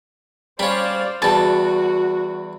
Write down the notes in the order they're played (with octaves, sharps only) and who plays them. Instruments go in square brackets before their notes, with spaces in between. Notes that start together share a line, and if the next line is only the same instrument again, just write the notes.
[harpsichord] G3 C#4 [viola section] C5 D5 F5 [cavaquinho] B5
[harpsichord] E2 G3 [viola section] F#4 [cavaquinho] A5